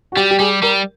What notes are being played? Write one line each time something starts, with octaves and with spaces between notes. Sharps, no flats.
F#4
G3 G4
G4
G3 G#4
G3 A#4